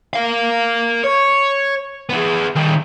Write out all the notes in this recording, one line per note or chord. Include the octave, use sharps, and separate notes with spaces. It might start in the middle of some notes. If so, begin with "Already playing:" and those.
A#4 F5
C#5
B3 G#4
D#3 G3